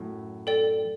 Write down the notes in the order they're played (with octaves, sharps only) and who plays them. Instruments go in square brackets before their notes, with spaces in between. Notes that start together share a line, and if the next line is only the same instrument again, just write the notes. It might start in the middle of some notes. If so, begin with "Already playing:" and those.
Already playing: [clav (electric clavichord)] F#2 A2
[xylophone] A4 D5 G5